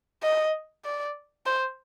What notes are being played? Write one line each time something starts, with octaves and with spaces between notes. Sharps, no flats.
D#5
D5
C5